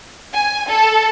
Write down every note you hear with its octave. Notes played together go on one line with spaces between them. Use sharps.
G#5
A4